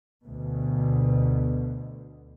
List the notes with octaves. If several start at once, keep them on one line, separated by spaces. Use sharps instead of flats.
D2 B2